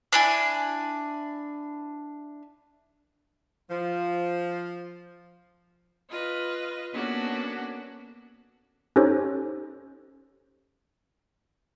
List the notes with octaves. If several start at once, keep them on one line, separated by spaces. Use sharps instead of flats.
D4 E4 G#5
F3
F4 B4 D#5
A#3 B3 C#4 D4 F#4 A4
C#4 D#4 G4 A4 C5 C#5